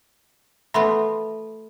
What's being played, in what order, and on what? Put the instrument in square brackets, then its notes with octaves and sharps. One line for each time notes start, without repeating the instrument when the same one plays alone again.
[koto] A3 B3 F4 [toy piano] E5 B5 C6